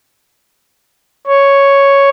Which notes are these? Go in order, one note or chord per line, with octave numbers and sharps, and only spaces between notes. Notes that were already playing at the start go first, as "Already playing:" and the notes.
C#5